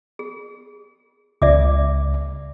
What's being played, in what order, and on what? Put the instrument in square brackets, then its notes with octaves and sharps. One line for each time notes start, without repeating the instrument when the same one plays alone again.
[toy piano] G#4
[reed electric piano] C#2 [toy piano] D5 E5 D6